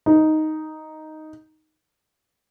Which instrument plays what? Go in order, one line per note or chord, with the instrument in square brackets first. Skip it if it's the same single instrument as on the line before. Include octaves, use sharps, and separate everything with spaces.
[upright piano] D#4